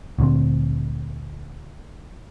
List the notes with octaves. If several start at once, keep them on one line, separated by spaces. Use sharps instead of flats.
D2 A#2 D3 C4